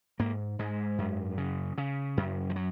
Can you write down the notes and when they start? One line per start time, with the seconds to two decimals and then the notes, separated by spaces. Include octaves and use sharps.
0.19 G#2 A#3
0.59 G#2 G#3
0.98 F#2
1.38 C#3
1.78 C#3
2.17 F#2
2.50 F3
2.56 F#3